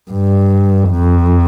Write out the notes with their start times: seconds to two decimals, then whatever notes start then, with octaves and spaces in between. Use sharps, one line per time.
0.11 G2
0.91 F2